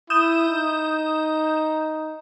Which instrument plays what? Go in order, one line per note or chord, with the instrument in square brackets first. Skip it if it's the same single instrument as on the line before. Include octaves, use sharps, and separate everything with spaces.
[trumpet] E4 [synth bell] D#6 G6 E7
[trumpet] D#4